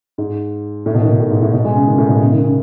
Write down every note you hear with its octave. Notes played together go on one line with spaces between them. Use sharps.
G#2
A2
B2
D#3
B2
A2
G#2
A2
B2
G#3
C#3
D#3
A2
B2
C#3
D#3
C#3